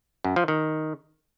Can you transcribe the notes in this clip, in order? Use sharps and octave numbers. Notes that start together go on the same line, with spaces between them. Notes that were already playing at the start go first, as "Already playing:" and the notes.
F#2
F3
D#3